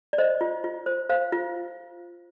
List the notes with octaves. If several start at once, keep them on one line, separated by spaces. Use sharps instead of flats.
D5
C5 D#5
F4
F4
C5
C5 F5
F4